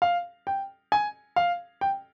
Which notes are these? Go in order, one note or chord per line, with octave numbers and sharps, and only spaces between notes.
F5
G5
G#5
F5
G5